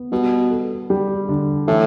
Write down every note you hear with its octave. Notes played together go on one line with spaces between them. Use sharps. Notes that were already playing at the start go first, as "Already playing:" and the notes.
Already playing: B3
B2 G3
A4
G3
D3
A2 E3